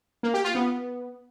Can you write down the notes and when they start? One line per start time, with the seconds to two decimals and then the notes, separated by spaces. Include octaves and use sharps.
0.23 A#3
0.34 G4
0.44 F4
0.55 B3